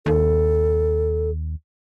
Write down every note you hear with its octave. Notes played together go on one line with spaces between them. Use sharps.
D#2 A4